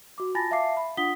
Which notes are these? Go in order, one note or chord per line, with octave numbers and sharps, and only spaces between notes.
F#4 D6
F4 G#5 A5 B5 A6 A#6
E5 F5 A5 D6 C7
B5
D4 F4 F#5 D#6 B6 G7